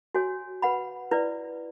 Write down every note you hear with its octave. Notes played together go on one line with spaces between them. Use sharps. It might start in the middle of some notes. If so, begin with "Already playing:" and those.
F#4 C#5 G#5
B4 F#5 B5
E4 B4 D5